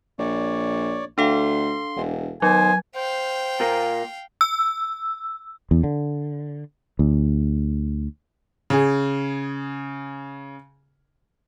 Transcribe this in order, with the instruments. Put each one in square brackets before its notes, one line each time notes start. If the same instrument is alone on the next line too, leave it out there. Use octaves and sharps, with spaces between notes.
[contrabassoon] A#1 [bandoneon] C#5 D5
[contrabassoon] D2 [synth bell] D4 A4 F5 [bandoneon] C6
[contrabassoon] E1
[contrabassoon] D#3 [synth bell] F#3 [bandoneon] B3 C5 [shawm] G#5
[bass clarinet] C5 [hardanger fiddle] F5 G5
[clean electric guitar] A#2 A#3
[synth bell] E6
[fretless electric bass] E2
D3
D2
[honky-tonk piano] C#3 G#4